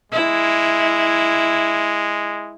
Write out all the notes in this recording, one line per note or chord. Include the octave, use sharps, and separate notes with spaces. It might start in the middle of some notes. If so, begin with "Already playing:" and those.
G#3 E4